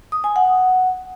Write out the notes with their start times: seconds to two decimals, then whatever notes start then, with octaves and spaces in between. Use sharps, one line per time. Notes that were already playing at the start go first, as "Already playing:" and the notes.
0.12 D#6
0.24 G#5
0.36 F#5